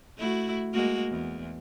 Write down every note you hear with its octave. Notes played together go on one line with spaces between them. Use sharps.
A3 E4 F#4
G#3 A#3 F#4
E2